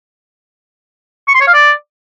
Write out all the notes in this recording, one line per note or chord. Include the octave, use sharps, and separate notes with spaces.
C#6
C6
C#5
F5
D5